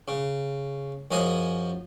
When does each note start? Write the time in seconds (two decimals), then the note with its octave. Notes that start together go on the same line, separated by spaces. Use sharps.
0.08 C#3
1.11 F#2 F3 G#4 D#5 D#6